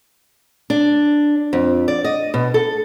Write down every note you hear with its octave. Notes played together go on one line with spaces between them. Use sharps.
D4
F2
D5
D#5
B2
A4